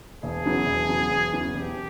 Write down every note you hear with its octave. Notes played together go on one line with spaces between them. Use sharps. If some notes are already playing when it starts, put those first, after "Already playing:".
E1 G#4
E2 C#3 F#3
E1
E2 C#3 F#3
E1
E2 C#3 F#3
E1 G4